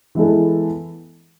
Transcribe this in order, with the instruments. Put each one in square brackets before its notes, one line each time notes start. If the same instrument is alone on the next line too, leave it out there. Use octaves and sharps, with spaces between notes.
[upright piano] E3 G#3 B3 E4 A4